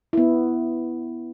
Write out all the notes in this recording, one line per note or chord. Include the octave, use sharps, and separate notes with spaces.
B3 E4